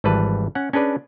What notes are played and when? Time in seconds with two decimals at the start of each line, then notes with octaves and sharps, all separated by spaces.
0.04 G#1 E3 G3 B4 A5
0.55 C#4 F#5
0.73 C#4 D4 G#4 B4 D5